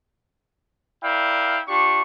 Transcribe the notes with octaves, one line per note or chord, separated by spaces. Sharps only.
E4 A#4 D5 F5 G5
D4 F4 G4 C#6